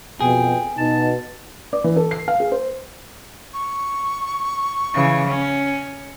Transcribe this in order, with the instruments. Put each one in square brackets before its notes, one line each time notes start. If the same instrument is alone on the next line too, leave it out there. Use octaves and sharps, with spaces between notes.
[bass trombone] F2 [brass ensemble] B2 [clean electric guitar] G#4 [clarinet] G5
[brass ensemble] B2 [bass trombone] D#4 [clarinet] A5
[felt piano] D5
E3
A4
C7
F5
G#4
C5
[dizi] C#6
[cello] C#3 E3
C#4